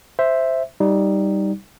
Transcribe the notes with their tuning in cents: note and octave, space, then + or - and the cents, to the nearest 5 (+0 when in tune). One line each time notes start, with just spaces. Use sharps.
C5 +0 E5 +0
G3 -5 D#4 +5